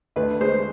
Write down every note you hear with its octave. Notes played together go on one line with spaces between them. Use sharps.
D2 B4
G#3 C5